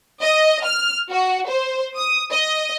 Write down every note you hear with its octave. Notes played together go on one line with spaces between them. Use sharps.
D#5
F6
F#4
C5
D#6
D#5